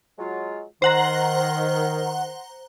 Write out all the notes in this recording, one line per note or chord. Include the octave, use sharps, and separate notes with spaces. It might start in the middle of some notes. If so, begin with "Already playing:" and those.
F#3 G#3 F4
D#3 C5 F#5 A#5